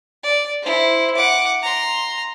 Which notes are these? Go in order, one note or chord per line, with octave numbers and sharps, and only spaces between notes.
D5
E4 C5
F#5 D6
A#5 C6